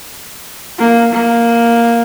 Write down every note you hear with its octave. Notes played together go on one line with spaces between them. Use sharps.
A#3
A#3